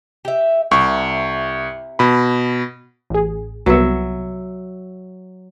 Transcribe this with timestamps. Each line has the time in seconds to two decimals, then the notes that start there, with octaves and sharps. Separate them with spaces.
0.25 G4 E5
0.71 C2 C3 E4 C#6
1.99 B2 B5
3.10 A1 G#4
3.66 C2 F#3 B3 E5 C#7